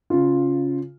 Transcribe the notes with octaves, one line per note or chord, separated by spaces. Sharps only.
C#3 F4